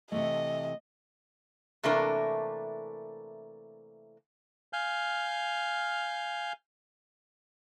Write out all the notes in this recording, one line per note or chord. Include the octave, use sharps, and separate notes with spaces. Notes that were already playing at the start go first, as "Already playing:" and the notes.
C3 E3 A3 D#5
C3 E3 A3 A#3 D4 A#4
F5 G#5 F6 G6